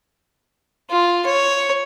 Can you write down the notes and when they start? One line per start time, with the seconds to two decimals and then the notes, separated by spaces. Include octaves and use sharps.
0.90 F4
1.26 C#5